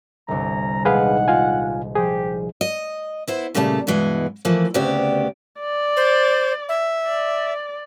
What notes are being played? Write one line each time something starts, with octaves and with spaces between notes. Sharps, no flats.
G1 C2 A#5
D#1 G#3 G#4 B4 F5 F#5
F4 F5 G#5
F3 G4 G#4 C5
D#5
B3 E4 C5
A#2 C#3 G3 A3 D#5 A5
G2 B2 E3 G#3
E3 F3 A3 A#3
D2 C#3 B3 C4 G4 D5
D5
C5
E5
D5